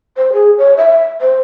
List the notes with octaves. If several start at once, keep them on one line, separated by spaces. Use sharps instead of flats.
C5
G#4
C#5
E5
C5